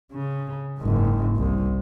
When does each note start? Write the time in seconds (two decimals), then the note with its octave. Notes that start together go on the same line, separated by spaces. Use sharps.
0.12 C#3
0.78 F#1 G#2
1.36 C2